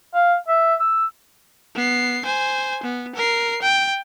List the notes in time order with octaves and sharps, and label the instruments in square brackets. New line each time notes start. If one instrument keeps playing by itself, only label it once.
[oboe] F5
E5
E6
[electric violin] B3 C7
C5 G#5
B3
A#4 C7
G5